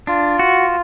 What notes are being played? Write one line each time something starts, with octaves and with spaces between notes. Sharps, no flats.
D4 F4
F#4